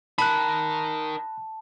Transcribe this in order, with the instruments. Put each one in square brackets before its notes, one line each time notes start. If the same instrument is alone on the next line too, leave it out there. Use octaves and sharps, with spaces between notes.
[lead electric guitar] D#4 A#4 [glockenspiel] A5 [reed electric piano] B5 F#6